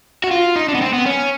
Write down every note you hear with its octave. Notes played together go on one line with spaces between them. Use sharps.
F#4
F4
D#4
D4
B3
C4
B3
C#4